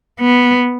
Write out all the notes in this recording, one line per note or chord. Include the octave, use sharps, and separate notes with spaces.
B3